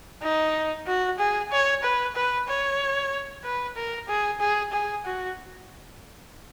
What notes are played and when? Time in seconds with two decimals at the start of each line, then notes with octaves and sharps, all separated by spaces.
0.22 D#4
0.87 F#4
1.19 G#4
1.51 C#5
1.83 B4
2.15 B4
2.48 C#5
3.44 B4
3.76 A#4
4.08 G#4
4.40 G#4
4.72 G#4
5.05 F#4